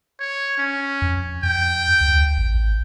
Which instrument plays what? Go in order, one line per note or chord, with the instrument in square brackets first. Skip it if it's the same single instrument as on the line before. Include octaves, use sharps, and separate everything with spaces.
[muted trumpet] C#5
C#4
[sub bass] F2
[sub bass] F2 [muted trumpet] G5
[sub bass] D2
A1